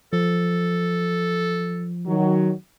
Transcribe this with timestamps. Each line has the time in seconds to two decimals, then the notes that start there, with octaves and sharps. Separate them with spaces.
0.13 F3 A4
2.07 D#3 F#3